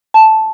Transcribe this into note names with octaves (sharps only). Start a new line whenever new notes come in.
A5